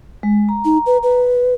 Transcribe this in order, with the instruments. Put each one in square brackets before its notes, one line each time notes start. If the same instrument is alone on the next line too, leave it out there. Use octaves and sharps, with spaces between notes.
[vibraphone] G#3
A#5
[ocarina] D#4
B4
B4